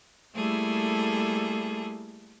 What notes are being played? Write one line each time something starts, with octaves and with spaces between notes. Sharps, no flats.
G3 A3 A#3 E4 G#4 A4